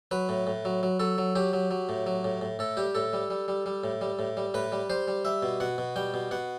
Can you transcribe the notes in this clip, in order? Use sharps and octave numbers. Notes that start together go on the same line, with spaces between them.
F#3 B4
A2
A2
F#3
F#3
F#3 A4
F#3
F#3 G4
F#3
F#3
A2
F#3
A2
A2
A2 A4
G3 G4
A2 A4
G3
G3
G3
G3
A2
G3
A2
G3
A2 B4
G3
G3 C5
G3
G3 E5
B2
B2 F#5
B2
G3 G5
B2
B2 F#5